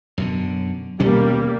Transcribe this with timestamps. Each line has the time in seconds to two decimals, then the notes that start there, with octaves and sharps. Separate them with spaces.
0.18 F#2 B2 D3
1.00 D#1 B2 G3 A#3 C#4